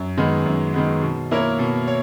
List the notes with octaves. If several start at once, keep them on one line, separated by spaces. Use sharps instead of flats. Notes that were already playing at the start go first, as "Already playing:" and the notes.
Already playing: F#2
D#3 G#3 B3
F#2
D#3 G#3 B3
B2
A#3 E4 A#4 C#5
B2
C#5